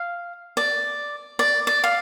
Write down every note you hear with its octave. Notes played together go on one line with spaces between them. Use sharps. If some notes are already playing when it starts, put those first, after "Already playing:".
Already playing: F5
D5
D5
D5
F5